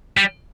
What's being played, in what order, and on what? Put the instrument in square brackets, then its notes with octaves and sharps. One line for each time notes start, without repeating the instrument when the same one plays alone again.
[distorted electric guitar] G3